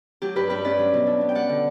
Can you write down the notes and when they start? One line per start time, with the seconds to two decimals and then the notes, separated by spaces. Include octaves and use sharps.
0.22 F#3 G4
0.36 G2 G4 B4
0.50 G2 G4 B4
0.64 C#4 B4 D5
0.79 F#3
0.94 B2
1.07 D4
1.21 B3
1.29 G5
1.35 G3 D5 F#5
1.49 D3